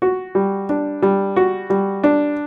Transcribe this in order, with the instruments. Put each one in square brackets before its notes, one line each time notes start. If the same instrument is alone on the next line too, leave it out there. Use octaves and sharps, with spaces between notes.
[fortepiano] F#4
G3
D4
G3
F#4
G3
D4